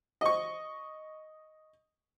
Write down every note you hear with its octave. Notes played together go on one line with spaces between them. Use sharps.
D#5 C#6